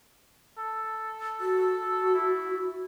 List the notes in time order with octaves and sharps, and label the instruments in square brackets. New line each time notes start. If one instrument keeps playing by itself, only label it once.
[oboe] A4
[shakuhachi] F#4
[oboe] E4